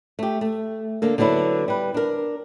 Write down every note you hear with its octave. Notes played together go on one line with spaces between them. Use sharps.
A3 G4
A3
D3 A#3 A4
D3 F#3 B3 D4 E4
G3 B4
D4 A#4